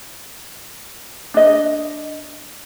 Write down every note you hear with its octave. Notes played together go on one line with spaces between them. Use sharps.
D4 D#5